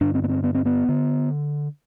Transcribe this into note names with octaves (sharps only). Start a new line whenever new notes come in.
G2 D3 D4
C4
B3
C4
B3
C4
B3
D3